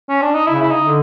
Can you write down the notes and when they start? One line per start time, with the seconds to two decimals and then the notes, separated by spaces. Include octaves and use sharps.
0.09 C#4
0.22 D4
0.35 D#4
0.47 C#3 E4
0.61 E4
0.71 D#4
0.82 D3